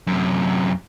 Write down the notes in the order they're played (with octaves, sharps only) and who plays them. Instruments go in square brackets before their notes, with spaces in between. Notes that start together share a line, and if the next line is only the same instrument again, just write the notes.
[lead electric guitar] F#2 C3